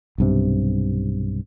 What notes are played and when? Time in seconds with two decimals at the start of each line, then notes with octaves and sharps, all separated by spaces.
0.18 B1 G2 C3